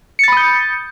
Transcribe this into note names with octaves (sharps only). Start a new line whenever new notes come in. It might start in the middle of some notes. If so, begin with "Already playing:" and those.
B5 D#6 G6 A6 C#7